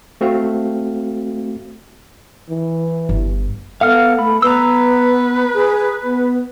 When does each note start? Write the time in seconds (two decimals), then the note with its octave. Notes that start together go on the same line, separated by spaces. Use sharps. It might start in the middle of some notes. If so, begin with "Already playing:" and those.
0.21 A3 C4 F#4 F5
2.49 E3
3.09 G1
3.81 B3 A4 F5 F#5 F6
4.19 A3 B5
4.42 B3 B4 A#5 E6
5.54 G#4
6.04 B3